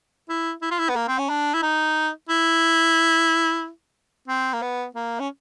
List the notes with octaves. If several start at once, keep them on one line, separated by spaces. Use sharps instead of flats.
E4
E4
F4
E4
B3
A#3
C4
C#4
D4
E4
D#4
E4
C4
A#3
B3
A#3
C#4